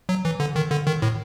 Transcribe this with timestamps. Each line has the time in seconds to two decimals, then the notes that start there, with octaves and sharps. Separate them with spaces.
0.09 F#3
0.25 E3
0.40 D3
0.56 D#3
0.71 D3
0.87 D#3
1.02 A2